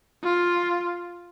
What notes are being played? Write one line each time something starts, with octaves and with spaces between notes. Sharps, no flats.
F4